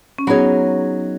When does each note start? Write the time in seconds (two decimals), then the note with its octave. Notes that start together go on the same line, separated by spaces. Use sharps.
0.18 C#4
0.27 F#3 B3 D#4 G#4 C#5